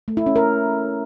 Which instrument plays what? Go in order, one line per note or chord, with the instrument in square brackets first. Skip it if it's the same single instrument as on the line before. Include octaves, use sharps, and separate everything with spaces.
[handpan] A3
E4
C#4
A#4